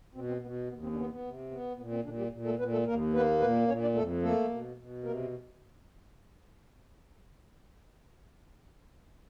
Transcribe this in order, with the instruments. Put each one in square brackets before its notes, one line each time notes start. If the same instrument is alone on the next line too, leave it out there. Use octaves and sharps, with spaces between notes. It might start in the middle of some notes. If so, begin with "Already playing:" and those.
[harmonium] B2 C4
C4
B2 B3
D#2 B3
C4
D4
C#3 B3 C#4
B3
C3
B3
A#2 B3
C4
A#2 D3 D4
G3 G4
A#2
A3 A4
A#2 B3 B4
A3 A4
D#2 A#3 A#4
A#3 B3 B4
A#2 B3 B4
A#2 C#4 C#5
D4 D5
F2 A3 A4
A3 A#3 A4
B2
B2
C3 A#3 A#4